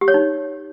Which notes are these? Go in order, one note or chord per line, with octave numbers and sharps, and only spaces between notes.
G4
C#5
D#4